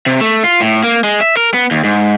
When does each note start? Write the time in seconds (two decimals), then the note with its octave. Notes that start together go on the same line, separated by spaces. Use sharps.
0.06 C3
0.21 A3
0.44 F4
0.60 A2
0.84 A#3
1.04 G#3
1.21 E5
1.37 A#4
1.54 B3
1.71 D#2
1.84 G#2